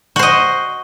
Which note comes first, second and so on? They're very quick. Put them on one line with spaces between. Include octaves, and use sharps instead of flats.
F#4 C5 D#5